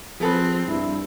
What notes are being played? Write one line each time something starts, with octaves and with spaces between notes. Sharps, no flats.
F3 C4 G#4 A4 B4
G2 E4